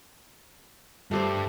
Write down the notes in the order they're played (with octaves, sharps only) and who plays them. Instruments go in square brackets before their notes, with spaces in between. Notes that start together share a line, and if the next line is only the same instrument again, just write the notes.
[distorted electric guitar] G2 [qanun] A3 G4 C5